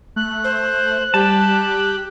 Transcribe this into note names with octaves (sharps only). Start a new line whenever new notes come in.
A3 F#6
C5
G3 G4 A5